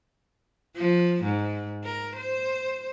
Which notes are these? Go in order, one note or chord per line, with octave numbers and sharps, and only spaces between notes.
F3
G#2
A#4
C5